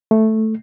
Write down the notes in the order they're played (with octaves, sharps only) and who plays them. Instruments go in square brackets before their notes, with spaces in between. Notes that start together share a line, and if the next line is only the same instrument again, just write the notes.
[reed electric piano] A3